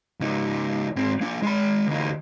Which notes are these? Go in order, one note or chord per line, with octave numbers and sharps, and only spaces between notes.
C#2 D#4
G#2 C4
A#3 D4
G#3 B5
D2 D#4